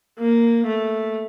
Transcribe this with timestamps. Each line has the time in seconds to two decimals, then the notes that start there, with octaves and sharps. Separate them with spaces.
0.19 A#3
0.66 A3